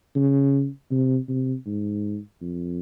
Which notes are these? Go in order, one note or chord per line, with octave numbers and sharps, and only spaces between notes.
C#3
C3
C3
G#2
F2